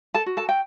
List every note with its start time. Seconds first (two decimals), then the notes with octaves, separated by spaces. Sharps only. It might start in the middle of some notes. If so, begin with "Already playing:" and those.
0.14 A4 A5
0.26 F#4
0.37 A4 A5
0.49 G5